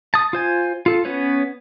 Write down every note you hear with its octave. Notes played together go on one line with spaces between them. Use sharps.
A5 D#6
F4 C5 G#5
F4 A4
B3 C#4 B4 C#5